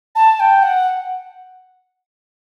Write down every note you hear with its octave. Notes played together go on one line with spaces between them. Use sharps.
A5
G5
F#5